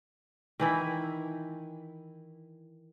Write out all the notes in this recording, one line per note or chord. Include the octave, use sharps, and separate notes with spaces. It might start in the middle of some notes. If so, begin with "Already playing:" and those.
D#3 E3 E4